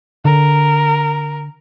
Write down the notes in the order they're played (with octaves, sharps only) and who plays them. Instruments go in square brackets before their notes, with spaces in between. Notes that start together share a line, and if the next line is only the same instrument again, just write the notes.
[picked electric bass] D3 [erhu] A#4